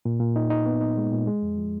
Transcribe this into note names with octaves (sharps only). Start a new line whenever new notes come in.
A#2
A#2
D#4
D#4
B3
D#4
G#3
A#2
G#3
F2
F3